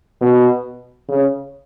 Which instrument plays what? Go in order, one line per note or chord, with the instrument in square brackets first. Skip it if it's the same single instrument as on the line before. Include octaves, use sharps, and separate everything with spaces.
[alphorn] B2
C#3